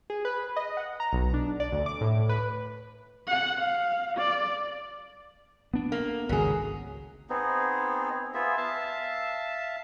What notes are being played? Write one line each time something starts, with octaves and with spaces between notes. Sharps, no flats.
G#4
B4
D#5
F#5
A#5
B1
D4
D5
D2
D6
A2
B4
F#5
F5
D5
B3 D4
A#3
G#1 C#2 F#3 G#4
B3 C4 D#4 G#4
B3 F4 G#4 E5
E5 F5 A5